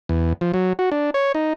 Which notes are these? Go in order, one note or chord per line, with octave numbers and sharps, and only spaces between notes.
E2
F3
F#3
F#4
D4
C#5
D#4